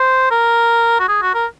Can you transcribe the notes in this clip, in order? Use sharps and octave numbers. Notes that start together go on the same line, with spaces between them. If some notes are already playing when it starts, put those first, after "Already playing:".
Already playing: C5
A#4
F#4
G#4
F#4
A#4